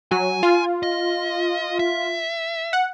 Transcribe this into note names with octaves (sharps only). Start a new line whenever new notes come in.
F#3 G#5
F4
D#5
E5
F#5